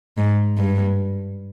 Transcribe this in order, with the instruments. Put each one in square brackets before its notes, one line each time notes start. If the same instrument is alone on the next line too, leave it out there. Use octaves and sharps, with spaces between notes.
[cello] G#2
G2